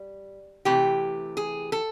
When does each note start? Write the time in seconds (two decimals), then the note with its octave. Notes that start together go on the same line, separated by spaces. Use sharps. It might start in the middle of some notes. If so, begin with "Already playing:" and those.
Already playing: G3
0.65 C3 E3 A3 G4
1.37 G#4
1.72 A4